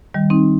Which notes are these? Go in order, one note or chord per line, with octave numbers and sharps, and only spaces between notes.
D#3 G3
C4 D#4